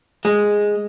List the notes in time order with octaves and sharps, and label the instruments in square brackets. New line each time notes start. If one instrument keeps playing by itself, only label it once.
[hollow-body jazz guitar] G#3